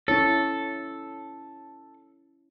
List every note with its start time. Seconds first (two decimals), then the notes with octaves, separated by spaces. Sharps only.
0.08 C#4 E4 A4 C#5